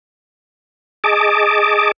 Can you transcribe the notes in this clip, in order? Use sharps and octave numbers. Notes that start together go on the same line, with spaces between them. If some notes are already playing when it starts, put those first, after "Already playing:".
G#4 D#5 A5 D6